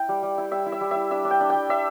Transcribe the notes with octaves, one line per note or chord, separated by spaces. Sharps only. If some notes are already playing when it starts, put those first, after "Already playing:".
Already playing: E4 G5
G3
G3
E4
G3 E5
E4
E5
G3
E4 E5
D4 E5
D4
G5
D4
G5
G3
D4 E5